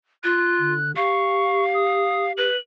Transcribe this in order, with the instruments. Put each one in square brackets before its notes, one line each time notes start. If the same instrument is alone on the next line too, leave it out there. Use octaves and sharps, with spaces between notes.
[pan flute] F4 [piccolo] F#6
[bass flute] D3
[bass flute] G4 [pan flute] F5 [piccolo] C#6
[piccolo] D#6
[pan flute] B4 [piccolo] F#7